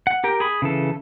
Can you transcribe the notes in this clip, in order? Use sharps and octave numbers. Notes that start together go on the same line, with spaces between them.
F#5
G4 A#4 G5
G#4 B5
C#3 E3 A4